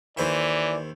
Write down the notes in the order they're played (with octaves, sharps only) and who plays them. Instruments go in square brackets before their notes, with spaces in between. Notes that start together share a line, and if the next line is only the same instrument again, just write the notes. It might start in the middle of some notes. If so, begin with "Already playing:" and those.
[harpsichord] D#2 C5 E5 [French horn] E3 [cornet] D5